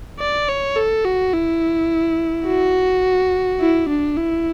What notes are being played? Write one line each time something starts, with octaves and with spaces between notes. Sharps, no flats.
D5
C#5
A4
F#4
E4
F#4
E4
D4
E4